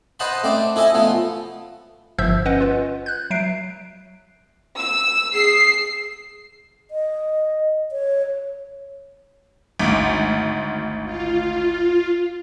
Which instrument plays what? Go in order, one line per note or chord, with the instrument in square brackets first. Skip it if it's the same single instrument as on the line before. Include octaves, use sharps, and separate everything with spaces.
[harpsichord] B4 C5 D#5 F#5 A5 B5
A3 C4 D5
E4 A4 D#5 E5 G#5
F3 A3 B3
[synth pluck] G1 G2 F3 E5 E6 G6
C#4 B4 D#5 F#5
F4 B4
F#6 G6
F#3 E5 C7 D7
[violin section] E6
[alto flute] G#4 [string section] C7
[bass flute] D#5
C#5
[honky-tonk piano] G#1 D2
[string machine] F4